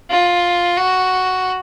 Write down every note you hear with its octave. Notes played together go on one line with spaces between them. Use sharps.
F4
F#4